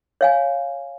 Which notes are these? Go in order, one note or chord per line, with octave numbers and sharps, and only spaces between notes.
C#5 F5 G#5